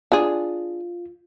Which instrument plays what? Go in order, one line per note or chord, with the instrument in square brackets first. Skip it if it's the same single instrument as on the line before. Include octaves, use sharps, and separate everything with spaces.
[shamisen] D4 G#4 [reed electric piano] F4